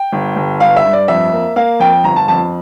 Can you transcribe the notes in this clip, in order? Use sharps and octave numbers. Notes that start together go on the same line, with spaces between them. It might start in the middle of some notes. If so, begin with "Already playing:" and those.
Already playing: G5
G1
G1
G2 F5
E5
G2
D5
F2 E5
A#3
A#3 F5
F2 G5
G1 A#5
A5
F2 A5